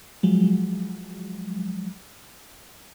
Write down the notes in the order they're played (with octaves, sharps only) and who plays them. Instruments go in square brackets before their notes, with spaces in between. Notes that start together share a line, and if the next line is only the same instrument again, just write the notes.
[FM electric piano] F3 F#3 G#3